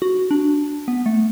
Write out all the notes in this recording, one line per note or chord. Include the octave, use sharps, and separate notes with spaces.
F#4
D4
B3
A3